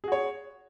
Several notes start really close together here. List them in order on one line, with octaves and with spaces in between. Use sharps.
G#4 F#4 C#5